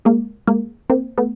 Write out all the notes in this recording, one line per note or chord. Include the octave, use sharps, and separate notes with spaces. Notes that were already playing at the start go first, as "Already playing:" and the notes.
G#3 A#3
G#3 A#3
A#3 C4
A3 B3